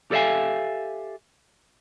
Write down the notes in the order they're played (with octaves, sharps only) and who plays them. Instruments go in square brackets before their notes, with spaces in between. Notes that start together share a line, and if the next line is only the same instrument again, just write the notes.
[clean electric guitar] G4 A4 D5 E5 F5 G#5